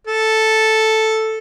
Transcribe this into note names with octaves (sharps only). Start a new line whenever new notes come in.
A4